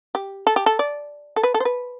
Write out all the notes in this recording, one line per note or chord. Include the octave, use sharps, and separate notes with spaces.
G4
A4
G4
A4
D5
A4
B4
A4
C5
B4